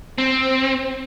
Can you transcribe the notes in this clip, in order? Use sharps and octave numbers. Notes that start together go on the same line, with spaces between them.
C4